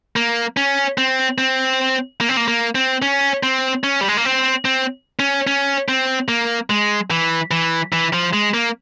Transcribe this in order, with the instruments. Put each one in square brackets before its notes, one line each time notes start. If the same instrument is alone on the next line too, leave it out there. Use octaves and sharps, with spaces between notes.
[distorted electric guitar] A#3
C#4
C4
C4
A#3
C4
A#3
A#3
C4
C#4
C4
C#4
G3
G#3
A#3
C4
C4
C#4
C#4
C4
A#3
G#3
E3
E3
E3
F3
G#3
A#3